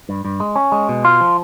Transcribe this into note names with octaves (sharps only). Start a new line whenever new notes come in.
G2
G2
G#3
C#4
G#3
B2
F4
F3